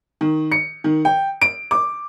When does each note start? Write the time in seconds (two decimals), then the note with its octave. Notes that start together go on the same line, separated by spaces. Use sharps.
0.21 D#3
0.52 C#7
0.84 D#3
1.05 G5
1.42 D7
1.71 D6